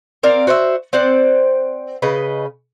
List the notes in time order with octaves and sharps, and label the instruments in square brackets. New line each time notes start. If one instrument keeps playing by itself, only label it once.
[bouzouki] C4 A#4 D5 F5
F#4 C5 C#5 E5
C4 C5 D5 F#5
C#3 B4 D#5